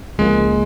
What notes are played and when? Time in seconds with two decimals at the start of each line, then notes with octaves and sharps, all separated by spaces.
0.18 C#2 C#3 F3 G#3 A#3